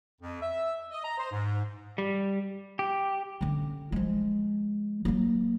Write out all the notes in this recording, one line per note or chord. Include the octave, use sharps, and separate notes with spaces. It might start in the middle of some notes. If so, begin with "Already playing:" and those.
F2
E5
D#5
A#5
C5
G#2
G3
G4
D3 C#4
F3 G#3
F#3 A#3